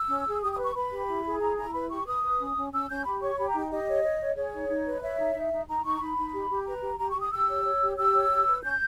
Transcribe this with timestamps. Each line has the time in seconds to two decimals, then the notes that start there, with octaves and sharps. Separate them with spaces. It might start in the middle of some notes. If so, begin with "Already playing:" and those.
Already playing: E6
0.09 C#4
0.27 G#4
0.43 G4 D#6
0.53 D#6
0.59 B4
0.64 C#6
0.75 B4 B5
0.92 G4
1.09 E4
1.25 G#4
1.41 E4 A#5
1.57 E4 A#5
1.74 B4 B5
1.90 G4 C#6
2.06 B4 D#6
2.23 B4
2.39 C#4
2.56 C#4
2.72 C#4 E6
2.89 C#4 G6
3.05 G4 B5
3.22 C#5 C#6
3.38 G4 B5
3.48 A#5
3.54 D#4 G5
3.71 G4 D#5
3.87 C#5
4.03 C#5
4.21 C#5
4.36 G#4 C#5
4.52 D#4
4.69 D#4
4.85 B4
5.02 C#5 E5
5.18 D#4
5.34 D#4
5.52 D#4
5.68 D#4 A#5
5.84 D#4 C#6
5.94 A#5
6.00 D#4 B5
6.17 D#4
6.33 G4
6.50 G4
6.66 B4 A#5
6.82 G4
6.99 G4 A#5
7.10 C#6
7.16 G4
7.21 D#6
7.32 G4 E6
7.48 C#5
7.65 C#5
7.81 G4
7.97 G4 E6
8.14 C#5
8.30 G4
8.46 B4
8.64 C#4 G6